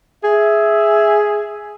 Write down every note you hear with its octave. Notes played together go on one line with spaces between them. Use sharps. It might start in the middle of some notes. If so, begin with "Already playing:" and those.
G#4 E5